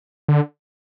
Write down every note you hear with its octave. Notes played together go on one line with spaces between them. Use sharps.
D3